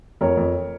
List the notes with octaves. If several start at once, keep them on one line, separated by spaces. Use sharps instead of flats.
F2 A#4 C#5
F2